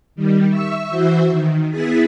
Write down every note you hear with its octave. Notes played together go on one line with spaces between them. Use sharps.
D#3 G3
E5 C#6 E6
E3 F#4 C5 E5
D#3
B3 E4 G#4 A6 B6